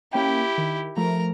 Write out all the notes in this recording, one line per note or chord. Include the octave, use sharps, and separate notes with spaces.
A#3 C#4 E4 G4 G5
D#3
F3 A3 A#4 A#5